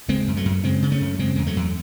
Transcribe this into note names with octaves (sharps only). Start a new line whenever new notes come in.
C#3 G#3 C4
F#2
F#3 A3
F#2
C#3 G#3 C4
C#3
A3 C#4
F#2
C#3 G#3 C4
E2 G#3
F#3 A3
E2